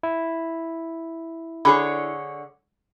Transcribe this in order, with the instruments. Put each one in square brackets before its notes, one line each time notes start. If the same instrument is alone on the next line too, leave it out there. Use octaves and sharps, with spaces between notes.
[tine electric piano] E4
[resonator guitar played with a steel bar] D3 G#4 C#5 [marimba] B5